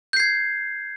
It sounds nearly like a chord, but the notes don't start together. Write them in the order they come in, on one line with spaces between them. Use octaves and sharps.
G6 C7 G#6